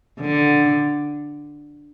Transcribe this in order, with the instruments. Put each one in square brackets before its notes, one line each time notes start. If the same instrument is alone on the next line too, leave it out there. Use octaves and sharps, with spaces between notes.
[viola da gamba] D3